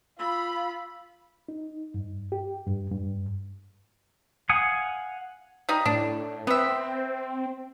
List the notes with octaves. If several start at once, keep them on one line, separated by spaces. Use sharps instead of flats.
F4 B5 E6
D#4
G2
G4
G2
G2
F5 F#5 G#5 D#6
G3 D#4
A2 D4
B3 C4 E5